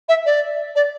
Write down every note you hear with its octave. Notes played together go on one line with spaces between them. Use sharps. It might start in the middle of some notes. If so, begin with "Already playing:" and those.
E5
D5
D5